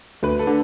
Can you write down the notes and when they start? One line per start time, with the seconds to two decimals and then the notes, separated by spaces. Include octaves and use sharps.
0.23 D2 B4
0.39 A4
0.47 D3